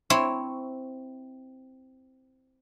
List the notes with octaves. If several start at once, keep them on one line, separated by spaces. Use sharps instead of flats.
C4 E4 C#5